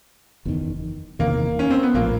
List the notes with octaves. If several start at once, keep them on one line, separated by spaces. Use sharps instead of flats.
F#1 E2 C3 D#3
F#1 E2 C3 D#3 A#3
C#4
C4
B3
A#1 A2 F3 A#3